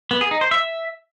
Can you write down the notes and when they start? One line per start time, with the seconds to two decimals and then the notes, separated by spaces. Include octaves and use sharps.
0.11 B3
0.21 G#4
0.31 D#4
0.41 C5
0.51 E5